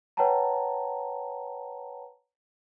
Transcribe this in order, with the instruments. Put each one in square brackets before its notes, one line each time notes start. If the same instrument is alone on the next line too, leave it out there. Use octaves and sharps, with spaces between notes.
[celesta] B4 C#5 F#5 G5 A5 A#5